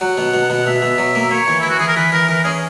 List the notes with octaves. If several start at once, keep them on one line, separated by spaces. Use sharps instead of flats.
F#3 F#5
B2
B2
B2 F#5
B2 E5
B2
F#3
A#3
A#3 C#5
E3
E3 E4
F#4
E3 G#4
A#4
E3 B4
E3 A#4
E3 A#4
C#4 G#4